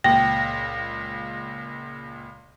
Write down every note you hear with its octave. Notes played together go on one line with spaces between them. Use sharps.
C#2 A#2 G5 A#6